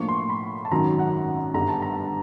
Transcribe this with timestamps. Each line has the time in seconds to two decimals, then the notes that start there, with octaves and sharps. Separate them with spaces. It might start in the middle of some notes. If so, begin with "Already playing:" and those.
Already playing: A2 F3 A#3 D4 C#6
0.08 C6
0.29 B5
0.65 A5
0.71 G#1 F#2 D#3 F#3 A#5
0.99 F#5
1.54 G1 G2 D3 G3 A#5
1.68 A5
1.82 A#5